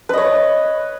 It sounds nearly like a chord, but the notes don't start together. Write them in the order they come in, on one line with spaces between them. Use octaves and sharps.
B4 D#5 C#5